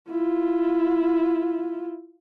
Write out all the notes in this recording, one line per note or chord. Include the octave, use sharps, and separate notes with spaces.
E4 F4